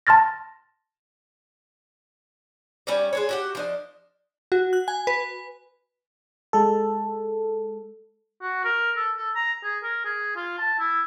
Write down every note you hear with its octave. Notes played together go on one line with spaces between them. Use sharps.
A5 C6 F6 A6 A#6
G3 C#4 C#5 D5
G#3 D4 C#5
F#4 G4 F#5
F3 D4 D#5
F#4
F#6
G#5
B4
G#3 A4
F#4
A#4
A4
A4
A#5
G#4
A#4
G#4
F4
A5
E4